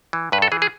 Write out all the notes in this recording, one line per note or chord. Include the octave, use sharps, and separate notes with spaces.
E3
G2 B4
A4
E3 G#4
G#4